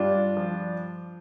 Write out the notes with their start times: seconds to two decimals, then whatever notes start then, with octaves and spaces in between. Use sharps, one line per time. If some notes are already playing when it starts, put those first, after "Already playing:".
Already playing: G2 D4 F4
0.37 F3